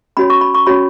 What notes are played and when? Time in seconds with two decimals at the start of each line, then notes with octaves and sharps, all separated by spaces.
0.17 C#4 F#4 C#5 B5
0.30 C#6
0.41 B5
0.54 C#6
0.66 C#4 F#4 C#5 B5